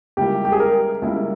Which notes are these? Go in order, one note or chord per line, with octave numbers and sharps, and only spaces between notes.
C#2 C#3 G3 A#3 E4 G4
G4
G#4
A#4
C#2 C#3 G3 A#3 E4